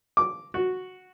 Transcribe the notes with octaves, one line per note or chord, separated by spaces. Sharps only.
D6
F#4